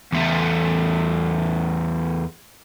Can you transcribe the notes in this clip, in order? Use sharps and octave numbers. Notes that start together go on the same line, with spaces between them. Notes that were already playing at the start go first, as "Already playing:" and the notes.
E2 A3